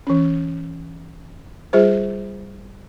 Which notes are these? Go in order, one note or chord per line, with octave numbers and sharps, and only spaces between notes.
E3 C#4
G3 F4 G#4 C5